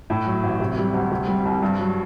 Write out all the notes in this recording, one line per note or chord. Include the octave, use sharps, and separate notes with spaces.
A2
F#3
A1
C3
G3
D2
C3
G3
C2
G2
F#3